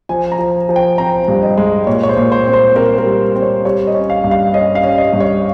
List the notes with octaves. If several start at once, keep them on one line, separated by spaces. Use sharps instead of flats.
F3 G#5
A#5
F3
F3
G5
C4 A#5
G2
D#5
G#3
A#2 C#5
C#5
C5
A#2
C5
C4
C5
C4 A#4
A#4
G3
C4
C#5
G3 C#5
D#5
C#4
F5
G2
F5
C#4 D#5
F5
C#4
D#5
G2
C#5